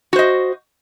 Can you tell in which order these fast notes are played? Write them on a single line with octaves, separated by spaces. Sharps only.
F#4 C5 D#5